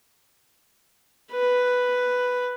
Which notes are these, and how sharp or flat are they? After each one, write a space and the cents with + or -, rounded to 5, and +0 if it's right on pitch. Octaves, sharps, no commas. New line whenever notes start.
B4 +5